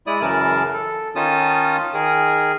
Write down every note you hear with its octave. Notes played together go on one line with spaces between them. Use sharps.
G#3 E4 D5 D#6
F#2 C#3 E3 A#4 A5
A4
D#3 C#4 D#4 F4 A5 D#6
D#3 G#4 A#4